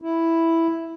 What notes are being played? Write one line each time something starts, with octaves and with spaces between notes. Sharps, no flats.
E4